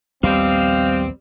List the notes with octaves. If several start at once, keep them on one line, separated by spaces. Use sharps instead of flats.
A#1 D#2 G3 B3 C4 D#5 F5